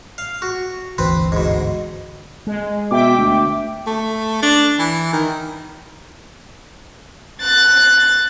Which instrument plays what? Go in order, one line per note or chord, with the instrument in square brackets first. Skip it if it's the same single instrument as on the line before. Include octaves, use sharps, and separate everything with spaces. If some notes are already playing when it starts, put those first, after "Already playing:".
[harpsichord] F5
F#4
[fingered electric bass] G1 D2 E3 [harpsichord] C4 B4
[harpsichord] G#2 B2
[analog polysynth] G#3
[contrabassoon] B2 [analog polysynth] E5 G5 D6
[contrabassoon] D2
[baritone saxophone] A3
D4
E3
D#3
[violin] F#6 A6